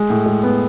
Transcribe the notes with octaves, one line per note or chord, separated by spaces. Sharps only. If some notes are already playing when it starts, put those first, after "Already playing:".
Already playing: G#3
A2
G#3
B3